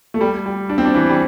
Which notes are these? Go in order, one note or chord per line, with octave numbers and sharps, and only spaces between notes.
A3
G3
G3
D4
C4
D4
E3
G3